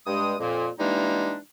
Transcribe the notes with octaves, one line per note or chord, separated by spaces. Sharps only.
G2 G#3 D#6
F2 A#2 A#3
E3 G3 G#3 A#3 D4 D#4